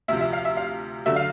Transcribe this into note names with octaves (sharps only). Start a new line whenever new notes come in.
D2 C3 F3 E5
E5
F5
E5
F5
D3 F#3 A3 E5
F5